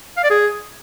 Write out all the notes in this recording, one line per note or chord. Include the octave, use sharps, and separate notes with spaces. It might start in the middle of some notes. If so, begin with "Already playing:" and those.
F5
D5
G#4